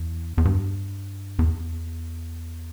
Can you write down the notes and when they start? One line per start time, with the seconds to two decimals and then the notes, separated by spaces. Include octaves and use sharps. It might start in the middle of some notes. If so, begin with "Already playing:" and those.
Already playing: E2
0.38 E2
0.45 G2
1.39 E2